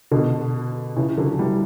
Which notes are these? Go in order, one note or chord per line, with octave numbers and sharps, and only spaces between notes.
B2 D3
C#3 E3
D3 F#3
E3 G3